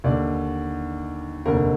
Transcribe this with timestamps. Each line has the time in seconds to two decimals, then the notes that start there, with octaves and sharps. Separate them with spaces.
0.04 D#2 D3 D5
1.46 F1 D#2 D3 A#4